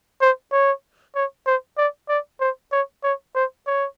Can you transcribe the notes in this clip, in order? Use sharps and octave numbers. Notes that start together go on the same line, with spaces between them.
C5
C#5
C#5
C5
D5
D5
C5
C#5
C#5
C5
C#5